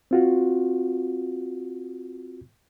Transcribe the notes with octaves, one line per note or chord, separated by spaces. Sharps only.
C4 F4 F#4